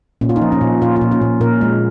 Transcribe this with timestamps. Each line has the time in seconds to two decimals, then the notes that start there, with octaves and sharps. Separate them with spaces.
0.21 A#2 C#4
0.29 F4
0.36 D#4
0.42 F3
0.52 C#4
0.61 A#2
0.81 A#2 F4
0.96 F4
1.01 A#2
1.11 C#4
1.22 A#2
1.41 A#2 A#4
1.61 G#3